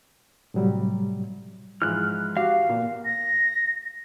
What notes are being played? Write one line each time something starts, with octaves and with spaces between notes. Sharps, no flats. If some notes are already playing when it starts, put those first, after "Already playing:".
A2 C3 F#3 G3
G#2 E3 F3 F6 F#6
F#4 G4 F5
A#2 A#3
A#6